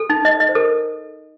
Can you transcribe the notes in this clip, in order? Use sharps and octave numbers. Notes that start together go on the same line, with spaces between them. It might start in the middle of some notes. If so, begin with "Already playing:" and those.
Already playing: A4
D#4
D#5
D#5
C5
A4 A#4